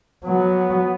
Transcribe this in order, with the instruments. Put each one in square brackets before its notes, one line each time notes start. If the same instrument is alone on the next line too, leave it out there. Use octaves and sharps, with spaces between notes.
[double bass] F#3 [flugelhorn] B3